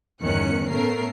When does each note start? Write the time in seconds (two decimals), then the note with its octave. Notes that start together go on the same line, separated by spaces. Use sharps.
0.23 G1 E2 D#3 C#4 F#6 C#7
0.70 A2 A3 B3 C#4 A#4 C7